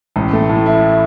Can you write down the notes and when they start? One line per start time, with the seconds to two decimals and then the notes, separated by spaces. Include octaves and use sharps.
0.16 A1
0.33 A3
0.49 A2
0.66 E4